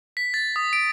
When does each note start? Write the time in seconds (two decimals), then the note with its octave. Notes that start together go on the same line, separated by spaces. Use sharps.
0.17 B6
0.34 A6
0.56 D#6
0.73 D7